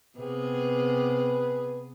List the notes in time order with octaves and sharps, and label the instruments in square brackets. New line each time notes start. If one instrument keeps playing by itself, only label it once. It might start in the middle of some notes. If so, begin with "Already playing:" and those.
[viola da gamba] C3 B3 G#4 [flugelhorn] B4